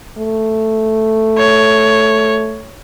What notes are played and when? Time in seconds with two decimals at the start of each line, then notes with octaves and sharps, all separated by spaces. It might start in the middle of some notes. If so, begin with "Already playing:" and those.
0.18 A3
1.38 C#5